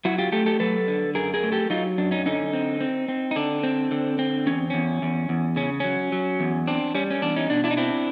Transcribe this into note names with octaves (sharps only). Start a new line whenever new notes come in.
F#3 E4 F#4
F4 G4
A3 G4 A4
G4 A4
F#3 A4 B4
D3
F#2 G#4 A#4
G#4 A#4
A3
G4 A4
F#3 D#4 F4
F#2 D4
C#4 D#4
D3 C#4 D#4
C4
C4
C4
D#4
D3 D4
C4
D3
C4
E2 C#4
E2 C#4
E2
E2
C#3 C#4
F#3 C#4
F#3
E2
C4 D4
G3 C#4
C#4
E2 D4
C#4 D#4
B2 D4
D4 E4
D#4
C4 D4 E4